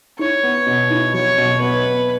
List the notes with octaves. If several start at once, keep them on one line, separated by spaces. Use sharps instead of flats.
E4 C#5
B3
B2
E4
F#3 C#5
B2
B3 B4
B3